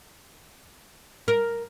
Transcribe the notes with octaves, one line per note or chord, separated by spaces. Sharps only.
A#4